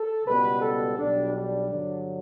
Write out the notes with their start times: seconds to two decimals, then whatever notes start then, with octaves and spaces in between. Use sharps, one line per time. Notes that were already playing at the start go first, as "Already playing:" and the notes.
Already playing: A4
0.24 C#2 B2 G3 B3 B4
0.61 A4
0.96 B1 B2 G3 D4
1.33 D4
1.69 G2 D3 F#3